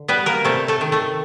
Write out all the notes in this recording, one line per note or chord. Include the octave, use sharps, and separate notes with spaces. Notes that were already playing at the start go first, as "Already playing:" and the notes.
Already playing: D3
G3 B3 B4
A#3 A#4
C3 A3 A4
A3 A4
D#3
A3 A4